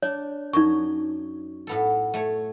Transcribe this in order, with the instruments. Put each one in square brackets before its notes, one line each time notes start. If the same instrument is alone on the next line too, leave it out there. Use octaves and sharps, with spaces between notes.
[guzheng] D4 [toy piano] C#5
[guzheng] F#2 [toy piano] D#4 C#6
[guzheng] A2 B3 A4
A3 C#5